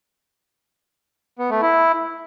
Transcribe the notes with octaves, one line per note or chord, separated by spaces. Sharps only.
B3
A3
E4